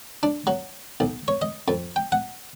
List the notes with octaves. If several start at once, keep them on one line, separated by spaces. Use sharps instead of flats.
D4
F#3
B1
C#5
D#5
F2
G5
F#5